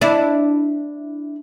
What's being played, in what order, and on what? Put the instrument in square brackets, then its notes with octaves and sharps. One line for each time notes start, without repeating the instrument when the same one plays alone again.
[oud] D4 E4